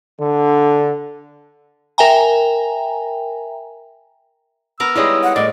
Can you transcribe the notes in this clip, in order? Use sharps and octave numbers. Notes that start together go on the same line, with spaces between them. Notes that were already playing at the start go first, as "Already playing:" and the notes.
D3
A#4 E5 G5 G#5 A#5
B3 A#4 E6
G3 G#3 D#4 E4 C#5 D#6
F#5
A2 D5 D#5